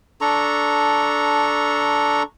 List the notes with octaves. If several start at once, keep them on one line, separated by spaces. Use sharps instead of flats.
D4 A4 A#5 C#6